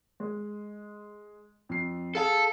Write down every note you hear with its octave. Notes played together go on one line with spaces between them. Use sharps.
G#3
F2 C7
G#4 A4 F5 A5